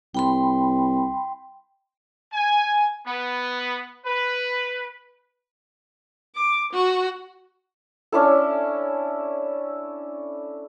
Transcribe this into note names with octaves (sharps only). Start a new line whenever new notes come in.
C2 G5 B5 C6
G#5
B3
B4
D6
F#4
C#4 D4 E4 A4